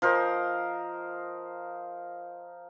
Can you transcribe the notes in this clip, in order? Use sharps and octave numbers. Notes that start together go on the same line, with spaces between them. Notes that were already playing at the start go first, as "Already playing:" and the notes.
F3 A#4 C5 D#5